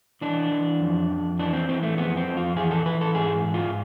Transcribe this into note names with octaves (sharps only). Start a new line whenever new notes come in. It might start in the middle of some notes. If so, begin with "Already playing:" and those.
E3 D4
E3
F2
F2
E3 D4
C4
E3 C4
A3
F2 B3
C4
F2
F4
E3 G#4
A4
E3 B4
A4
G#2 G#4
G#2
F4